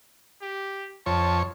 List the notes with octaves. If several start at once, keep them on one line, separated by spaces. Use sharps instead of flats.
G4
F2 C#5 A5